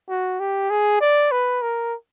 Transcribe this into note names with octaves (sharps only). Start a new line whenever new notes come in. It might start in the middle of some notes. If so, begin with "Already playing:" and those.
F#4
G4
G#4
D5
B4
A#4